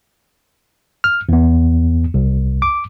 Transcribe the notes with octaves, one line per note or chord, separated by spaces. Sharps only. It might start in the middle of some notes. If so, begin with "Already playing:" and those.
F6
E2 B3
C2
D6